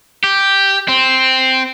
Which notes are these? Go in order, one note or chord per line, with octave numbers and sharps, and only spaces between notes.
G4
C4